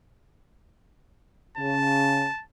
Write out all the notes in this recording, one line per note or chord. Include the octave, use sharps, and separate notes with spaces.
C#3 A5